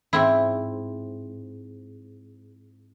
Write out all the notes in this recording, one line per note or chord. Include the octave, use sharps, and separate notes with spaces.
G#2 C4 E4